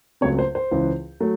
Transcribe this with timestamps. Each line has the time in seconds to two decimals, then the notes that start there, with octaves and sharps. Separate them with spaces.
0.21 C#2 C#3 F#3 A3 C4 C#5
0.39 C5
0.55 C5
0.71 C#2 C#3 E3
1.20 F#3 A3